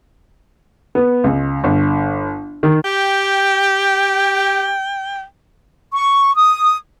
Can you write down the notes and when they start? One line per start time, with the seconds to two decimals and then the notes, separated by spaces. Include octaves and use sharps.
0.95 B3
1.24 C#2
1.64 G1
2.63 D#3
2.85 G4 G5
5.93 C#6
6.36 D#6